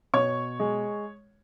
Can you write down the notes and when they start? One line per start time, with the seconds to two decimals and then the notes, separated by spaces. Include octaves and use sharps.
0.14 B2 C#5 C#6
0.60 G#3